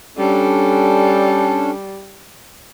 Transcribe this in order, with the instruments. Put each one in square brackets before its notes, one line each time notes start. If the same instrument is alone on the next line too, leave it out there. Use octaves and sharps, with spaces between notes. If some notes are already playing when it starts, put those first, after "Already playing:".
[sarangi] G3 [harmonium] C#4 D4 A4